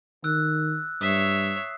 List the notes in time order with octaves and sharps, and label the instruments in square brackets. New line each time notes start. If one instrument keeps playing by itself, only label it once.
[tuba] D#3 [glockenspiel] E6 F#6
[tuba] G2 [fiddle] C#5 E5 [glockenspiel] D#6 E6 C7